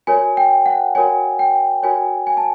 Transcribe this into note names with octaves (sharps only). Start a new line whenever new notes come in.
F#4 A#4 C#5 G#5
G5
F#5
F#4 A#4 C#5 G#5
G5
F#4 A#4 C#5 G#5
G#5
A5